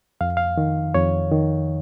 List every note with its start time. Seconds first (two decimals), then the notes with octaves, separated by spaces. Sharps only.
0.21 F2 F5
0.37 F5
0.58 D#3
0.94 F2 C#5
1.32 D#3